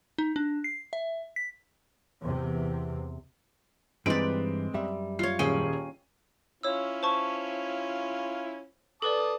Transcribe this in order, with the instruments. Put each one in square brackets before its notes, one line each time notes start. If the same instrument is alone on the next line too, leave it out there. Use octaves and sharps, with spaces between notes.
[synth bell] D#4
D4
C7
E5
B6
[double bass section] E2 C3
[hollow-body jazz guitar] G2 E3 D#4 [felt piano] G#3 C4 D7 [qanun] B4 D5
[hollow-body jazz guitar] F#2 G3 E5
[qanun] F4 C#5 [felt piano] C7
[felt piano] D#1 G#4 D#7 [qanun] C#4 G5
[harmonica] C#4 E4 F4 [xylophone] C#5 E6
[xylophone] C5 A5 C#6
[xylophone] A4 B4 D5 [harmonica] A5 D6 D#6